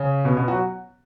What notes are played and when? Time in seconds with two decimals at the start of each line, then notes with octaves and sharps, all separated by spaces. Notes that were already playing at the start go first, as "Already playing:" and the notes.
Already playing: C#3 C#4
0.25 B2 B3
0.37 B2 B3
0.48 F#3 F#4